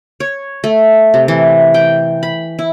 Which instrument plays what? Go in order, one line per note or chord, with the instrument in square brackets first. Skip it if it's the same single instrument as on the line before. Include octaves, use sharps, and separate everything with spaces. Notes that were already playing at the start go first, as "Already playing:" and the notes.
[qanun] C#5
A3
C3
E3
G5
B5
E4